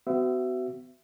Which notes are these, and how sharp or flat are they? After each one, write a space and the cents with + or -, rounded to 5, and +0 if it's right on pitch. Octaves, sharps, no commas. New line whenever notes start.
B3 +40 F#4 +25 E5 +20